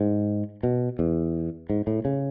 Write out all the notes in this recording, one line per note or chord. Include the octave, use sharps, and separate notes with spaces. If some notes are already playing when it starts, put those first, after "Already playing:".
Already playing: G#2
B2
E2
G#2
A2
C#3